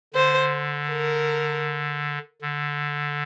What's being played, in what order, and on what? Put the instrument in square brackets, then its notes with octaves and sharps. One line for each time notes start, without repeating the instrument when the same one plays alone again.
[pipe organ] D3 [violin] C5
[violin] A#4
[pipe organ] D3